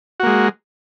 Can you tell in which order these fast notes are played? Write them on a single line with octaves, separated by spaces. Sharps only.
F#4 A#3 G#3